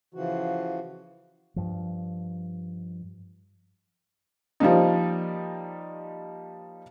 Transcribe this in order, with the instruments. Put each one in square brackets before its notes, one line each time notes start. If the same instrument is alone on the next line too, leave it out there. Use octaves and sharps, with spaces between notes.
[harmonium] C#3 E3 F3 F#4
[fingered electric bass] G2 F3
[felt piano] F3 G3 A#3 D#4